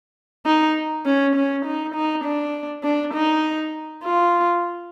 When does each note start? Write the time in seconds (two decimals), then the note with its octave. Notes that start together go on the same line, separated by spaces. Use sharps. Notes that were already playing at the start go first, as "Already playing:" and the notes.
0.46 D#4
1.06 C#4
1.35 C#4
1.65 D#4
1.94 D#4
2.24 D4
2.84 D4
3.14 D#4
4.03 F4